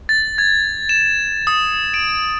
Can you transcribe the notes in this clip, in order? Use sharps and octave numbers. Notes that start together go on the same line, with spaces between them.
A6
G#6
E7
D#6
D7